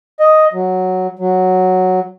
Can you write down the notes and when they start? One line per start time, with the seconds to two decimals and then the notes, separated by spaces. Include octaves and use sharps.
0.20 D#5
0.53 F#3
1.19 F#3